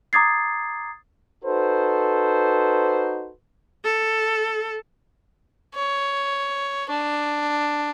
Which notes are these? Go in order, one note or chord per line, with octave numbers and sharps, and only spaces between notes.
A#5 D6 D#6 G#6 A6 C7
D#4 F#4 A4 B4 C5
A4
C#5
D4